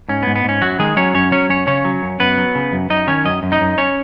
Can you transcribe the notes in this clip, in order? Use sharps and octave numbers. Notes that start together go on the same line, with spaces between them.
G#2 C#4
B3
G#2
B3
G#2 C#4
F#2 F#3 F#4
D#3 G#3 G#4
F#3 C#4 C#5
F#2 C#4 C#5
F#3 C#4 C#5
F#2 C#4 C#5
C#3 C#4 C#5
F#3
F#2
F#2 B3 B4
F#3
C#3
F#2
F#2 D#4 D#5
D#3 C#4 C#5
F#2 D#5
F#2
D#4 D#5
F#2
C#4 C#5